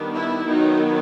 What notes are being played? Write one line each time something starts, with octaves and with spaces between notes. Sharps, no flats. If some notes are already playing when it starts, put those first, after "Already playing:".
Already playing: D#3 G3 B3 D4
E4
D#3 F#3 B3 D#4